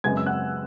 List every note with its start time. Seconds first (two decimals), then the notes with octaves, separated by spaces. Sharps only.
0.04 F#2 C#3 G#3 B3 G#5 G#6
0.17 E6
0.26 F#5 F#6